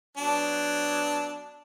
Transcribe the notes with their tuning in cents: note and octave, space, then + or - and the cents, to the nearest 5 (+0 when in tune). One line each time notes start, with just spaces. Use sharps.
F#3 -5 B3 +0 D4 -5